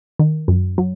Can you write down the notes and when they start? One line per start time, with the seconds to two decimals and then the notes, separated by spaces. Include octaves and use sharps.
0.19 D#3
0.48 F#2
0.78 F#3